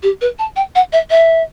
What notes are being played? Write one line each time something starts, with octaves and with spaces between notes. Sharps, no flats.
G4
B4
A5
G5
F#5
E5
E5